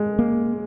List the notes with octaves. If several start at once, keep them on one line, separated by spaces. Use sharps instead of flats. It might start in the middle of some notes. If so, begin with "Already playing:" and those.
Already playing: G#3
A#3